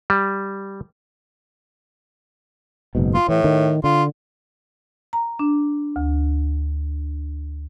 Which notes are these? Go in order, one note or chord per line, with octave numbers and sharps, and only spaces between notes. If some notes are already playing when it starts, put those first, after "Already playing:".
G3
F#1 G#2 B2
F4
A2 E3
D#3
D3 F4
A#5
D4
D2